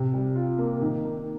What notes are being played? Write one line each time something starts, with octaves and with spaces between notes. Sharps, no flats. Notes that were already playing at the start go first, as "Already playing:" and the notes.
Already playing: C3
G3
F4
A#3
D#3
A#3